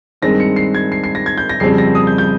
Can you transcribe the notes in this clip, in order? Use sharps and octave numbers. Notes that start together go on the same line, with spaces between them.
G2 D#3 G#3 C4 A#6
C#7
C7
G#6
C7
C7
A#6
G#6
G6
A#6
F2 C#3 G3 C4 C7
A#6
D#6
G6
G6